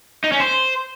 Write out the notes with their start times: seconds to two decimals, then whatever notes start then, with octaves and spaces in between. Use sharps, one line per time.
0.24 D#4
0.32 C#4
0.40 C5